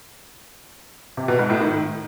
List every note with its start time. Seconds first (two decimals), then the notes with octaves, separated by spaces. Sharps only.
1.17 C3
1.28 B2
1.39 G#2
1.50 A2
1.61 D#3